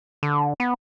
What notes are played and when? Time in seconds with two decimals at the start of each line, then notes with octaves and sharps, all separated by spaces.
0.23 D3
0.60 B3